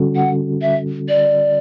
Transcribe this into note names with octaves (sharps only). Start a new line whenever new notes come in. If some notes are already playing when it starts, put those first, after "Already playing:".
Already playing: D3 G3 C#4 F#4 A4
F#5
E5
D5